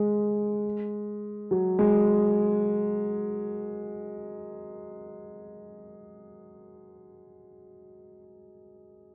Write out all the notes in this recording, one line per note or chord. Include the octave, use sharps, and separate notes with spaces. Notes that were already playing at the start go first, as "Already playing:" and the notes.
Already playing: G#3
F#3
G#3